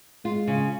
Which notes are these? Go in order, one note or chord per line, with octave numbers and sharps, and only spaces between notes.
G#3 F4
C#3